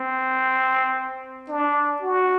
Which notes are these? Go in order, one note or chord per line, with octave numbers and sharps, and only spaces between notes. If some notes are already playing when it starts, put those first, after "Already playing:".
Already playing: C4
D4
F#4